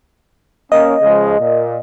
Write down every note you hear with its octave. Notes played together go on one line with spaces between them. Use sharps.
A#3 C#4 D#5
C#3 F3 G#3
A#2